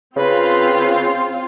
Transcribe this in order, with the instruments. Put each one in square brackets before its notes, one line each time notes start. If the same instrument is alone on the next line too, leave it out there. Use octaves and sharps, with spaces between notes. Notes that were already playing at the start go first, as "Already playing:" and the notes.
[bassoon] C#3 [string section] C4 F4 [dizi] B4